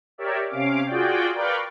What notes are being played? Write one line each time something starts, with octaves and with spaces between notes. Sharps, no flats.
G4 A#4 C#5 D5 E5
C3 C#4 F5 D6
F4 F#4 G#4 D5 G5
A#4 B4 D5 F5 G5 C#6